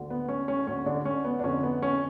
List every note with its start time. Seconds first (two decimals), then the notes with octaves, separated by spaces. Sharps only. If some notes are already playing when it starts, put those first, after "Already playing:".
Already playing: D2 D3
0.10 B3
0.28 C#4
0.48 C#4
0.67 D2 D3 C#4
0.86 D3 D4
1.05 C#4
1.24 B3
1.39 D4
1.44 F2 D3 C#4
1.63 B3
1.82 C#4